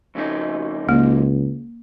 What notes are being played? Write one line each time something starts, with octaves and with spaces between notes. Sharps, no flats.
F2 C#3 D#4
C#2 A#3